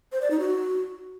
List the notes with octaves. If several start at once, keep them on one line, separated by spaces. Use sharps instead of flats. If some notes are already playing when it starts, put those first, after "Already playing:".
C5
D5
D#4
F#4